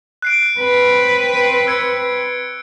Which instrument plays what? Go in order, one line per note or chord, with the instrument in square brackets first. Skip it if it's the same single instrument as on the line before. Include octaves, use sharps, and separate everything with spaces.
[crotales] F#6 C7 D7
[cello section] C4 B4
[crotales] E6 G#6 C#7